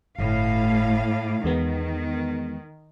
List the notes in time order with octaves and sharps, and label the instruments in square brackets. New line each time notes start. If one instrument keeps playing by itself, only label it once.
[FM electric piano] G1 [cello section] A2 F5
[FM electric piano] E2 G#3 B3 [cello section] D#3